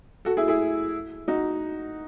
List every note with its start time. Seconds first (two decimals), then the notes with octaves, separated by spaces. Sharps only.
0.25 F#4 A4
0.37 E4 G#4
0.48 E4 G#4
1.28 D#4 F#4